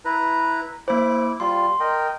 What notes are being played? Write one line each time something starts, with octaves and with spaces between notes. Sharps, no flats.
E4 B4 A#5
A#3 E4 C5 D6
G3 F4 C6
A#4 D#5 G5